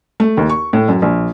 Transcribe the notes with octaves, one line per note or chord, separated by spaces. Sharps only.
A3
D#2
C#6
A2
F#2
A#1